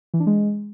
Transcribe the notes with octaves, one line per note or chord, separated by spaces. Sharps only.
E3
D4
G#3